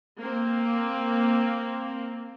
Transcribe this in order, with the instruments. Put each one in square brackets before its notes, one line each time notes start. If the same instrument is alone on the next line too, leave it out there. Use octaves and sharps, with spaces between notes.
[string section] A#3 C4